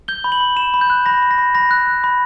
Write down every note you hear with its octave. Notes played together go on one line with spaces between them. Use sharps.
G6 G7
B5
F#7
B5
B5 E7
B5
G6
F#6
B5 A#6
B5
A#6
B5
B5 A#6
F#6
F#6
B5